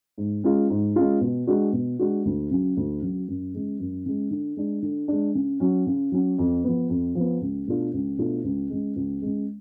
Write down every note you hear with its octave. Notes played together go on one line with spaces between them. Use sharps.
G#2
G#3 C#4 F4
G#2
G#3 C#4 F4
B2
G#3 D4 F#4
B2
G#3 D4 F#4
D2
C#3 F#3
D2
C#3 F#3
F#2
C#3 G#3
F#2
C#3 G#3
D3
G#3 D4
D3
G#3 D4
C#3
F#3 C#4
C#3
F#3 C#4
F2
F3 B3
F2
F3 B3
C#2
B2 A3 D4 F4
C#2
B2 A3 D4 F4
C#2
C#3 G#3
C#2
C#3 G#3